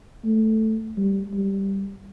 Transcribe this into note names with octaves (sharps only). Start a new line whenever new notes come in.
A3
G3
G3